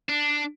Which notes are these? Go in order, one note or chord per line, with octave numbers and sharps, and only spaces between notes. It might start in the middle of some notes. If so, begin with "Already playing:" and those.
D4